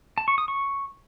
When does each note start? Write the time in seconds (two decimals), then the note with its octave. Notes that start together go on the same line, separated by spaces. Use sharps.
0.18 A5
0.28 C#6
0.38 D#6
0.48 C#6